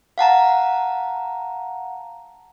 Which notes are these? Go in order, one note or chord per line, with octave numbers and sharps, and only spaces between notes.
F5 F#5 A5 A#5